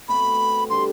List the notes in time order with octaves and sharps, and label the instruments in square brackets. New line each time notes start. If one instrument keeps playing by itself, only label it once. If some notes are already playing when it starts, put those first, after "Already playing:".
[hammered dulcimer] B2 A3 C4 F#4 [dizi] B5
[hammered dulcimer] D3 G3 C4 [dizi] C6